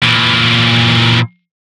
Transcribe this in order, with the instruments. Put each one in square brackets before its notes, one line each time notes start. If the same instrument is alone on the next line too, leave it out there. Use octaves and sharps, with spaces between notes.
[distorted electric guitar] A#2 E3